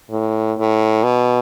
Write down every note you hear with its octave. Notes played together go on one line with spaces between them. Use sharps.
A2
A2
B2